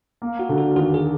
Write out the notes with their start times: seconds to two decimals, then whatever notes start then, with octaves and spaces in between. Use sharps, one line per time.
0.22 A#3
0.39 F#4
0.49 D3
0.58 F#4
0.76 D#2 F#4
0.94 G#4